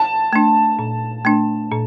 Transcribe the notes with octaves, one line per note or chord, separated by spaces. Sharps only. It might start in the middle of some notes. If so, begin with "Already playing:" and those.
Already playing: A5
A3 D4
A#2
A3 D4
A#2